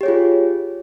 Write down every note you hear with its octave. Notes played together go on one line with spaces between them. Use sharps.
F4 G4 G#4 C#5